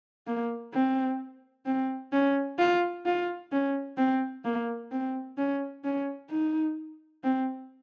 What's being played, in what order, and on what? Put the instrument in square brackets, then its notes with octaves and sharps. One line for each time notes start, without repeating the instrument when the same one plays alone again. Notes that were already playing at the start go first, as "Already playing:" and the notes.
[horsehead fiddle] A#3
C4
C4
C#4
F4
F4
C#4
C4
A#3
C4
C#4
C#4
D#4
C4